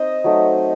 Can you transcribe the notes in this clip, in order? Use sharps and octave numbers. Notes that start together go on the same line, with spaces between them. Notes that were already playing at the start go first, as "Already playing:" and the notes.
Already playing: C4 D#4 C5 D#5 D#6
F#3 A3 D#4